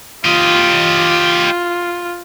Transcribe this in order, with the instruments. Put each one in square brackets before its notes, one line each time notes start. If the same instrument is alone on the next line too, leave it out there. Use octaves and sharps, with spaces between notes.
[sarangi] F4 [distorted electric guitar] G4 D#5